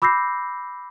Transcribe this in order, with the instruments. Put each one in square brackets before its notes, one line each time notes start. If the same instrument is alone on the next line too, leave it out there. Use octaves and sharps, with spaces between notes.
[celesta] B5 D6 E6 G6 A#6 C7